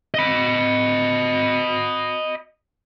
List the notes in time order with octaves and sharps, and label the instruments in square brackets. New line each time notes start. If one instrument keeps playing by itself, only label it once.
[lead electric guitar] D#5 B5